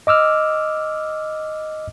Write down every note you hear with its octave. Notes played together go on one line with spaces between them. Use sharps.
D#5 D6 E6 F6